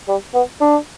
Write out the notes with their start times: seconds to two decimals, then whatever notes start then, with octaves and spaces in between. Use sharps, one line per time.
0.08 G3
0.34 B3
0.61 D4